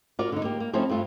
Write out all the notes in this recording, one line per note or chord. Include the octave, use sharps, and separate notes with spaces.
F4 F#4 A#4 D5
D3 D#4
A#3 G4
A#3
F3 A3 C4 C#4 D#4 E4
G2 A3 F4